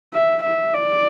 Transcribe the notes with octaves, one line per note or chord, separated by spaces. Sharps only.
E5
E5
D5